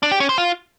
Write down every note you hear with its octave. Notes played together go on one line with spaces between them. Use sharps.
D4
G4
C#4
C5
F4